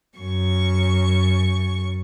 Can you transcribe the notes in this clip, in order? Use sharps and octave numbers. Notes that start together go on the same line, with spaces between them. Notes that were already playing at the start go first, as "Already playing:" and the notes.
F#2 C#6